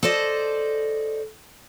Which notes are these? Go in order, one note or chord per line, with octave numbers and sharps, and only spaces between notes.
A4 C5 D5 D#5